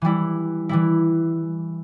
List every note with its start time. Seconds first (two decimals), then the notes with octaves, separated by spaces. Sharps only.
0.02 E3 G3 E4
0.69 E3 G3 E4